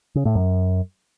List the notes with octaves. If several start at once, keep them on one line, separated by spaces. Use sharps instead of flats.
C#3
A2
F#2